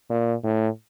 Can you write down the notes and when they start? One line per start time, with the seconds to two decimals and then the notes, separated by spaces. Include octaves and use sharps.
0.10 A#2
0.44 A2